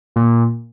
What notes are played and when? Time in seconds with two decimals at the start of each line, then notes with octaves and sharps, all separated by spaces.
0.16 A#2